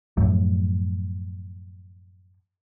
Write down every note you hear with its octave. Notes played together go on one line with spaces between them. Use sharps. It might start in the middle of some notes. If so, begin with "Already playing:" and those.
F#2 A2 F3